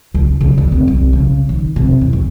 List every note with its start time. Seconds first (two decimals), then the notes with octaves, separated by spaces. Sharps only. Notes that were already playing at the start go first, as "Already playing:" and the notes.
0.14 C#2
0.41 C#3
0.58 D2
0.72 C4
0.87 C2
1.13 C#3
1.49 D#3
1.76 C3
2.01 E2
2.13 D2